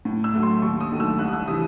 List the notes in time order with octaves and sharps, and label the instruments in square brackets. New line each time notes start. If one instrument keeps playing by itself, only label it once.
[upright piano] A2
E6
F#3 A3
C6
D#2 C#6
D#6
D#3 F#3 A3
E6
C2 F#6
D#6
E6
C3 E3 D#6